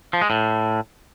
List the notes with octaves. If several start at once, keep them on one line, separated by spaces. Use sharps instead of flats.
F3
G#3
A2